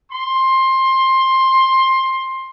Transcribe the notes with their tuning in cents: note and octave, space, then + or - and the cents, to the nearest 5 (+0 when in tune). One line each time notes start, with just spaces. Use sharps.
C6 +15